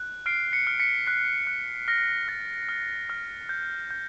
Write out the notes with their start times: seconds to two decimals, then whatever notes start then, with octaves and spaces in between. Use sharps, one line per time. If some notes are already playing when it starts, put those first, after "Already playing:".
Already playing: F#6
0.26 F6 C7 D7
0.53 B6 C#7
0.67 F6
0.80 B6 C#7
1.07 F#6 C7
1.47 F#6
1.88 F6 A#6
2.28 F6 A6
2.69 F6
3.10 F6
3.49 G6
3.91 G6